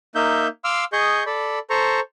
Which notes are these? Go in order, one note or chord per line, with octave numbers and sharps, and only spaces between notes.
A#3 D#4 E5 G6
F5 C6 D6 E6 F6
G#4 D#5 C#6 G6
A4 D5 B5
A4 C5 A#5 C#6